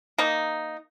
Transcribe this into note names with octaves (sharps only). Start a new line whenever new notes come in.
A#3 D#4